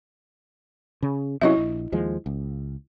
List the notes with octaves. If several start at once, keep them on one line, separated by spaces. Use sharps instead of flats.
C#3
C3 F#3 C#4 E4 D#5 E5
A#1
D#2 F3 G#3
C#2